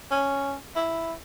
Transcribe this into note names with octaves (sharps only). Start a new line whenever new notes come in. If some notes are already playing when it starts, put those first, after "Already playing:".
C#4
E4